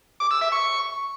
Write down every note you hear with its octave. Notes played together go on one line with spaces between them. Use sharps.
D6
E6
E5
C#6